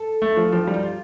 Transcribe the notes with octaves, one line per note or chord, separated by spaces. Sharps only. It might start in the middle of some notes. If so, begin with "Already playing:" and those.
Already playing: A4
A3
F3
F3 G4
G3
D#4
F4